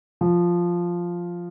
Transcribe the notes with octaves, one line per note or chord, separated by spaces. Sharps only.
F3